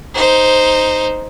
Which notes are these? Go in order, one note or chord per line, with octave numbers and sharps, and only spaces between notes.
D#4 C5